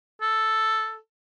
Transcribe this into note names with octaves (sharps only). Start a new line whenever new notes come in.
A4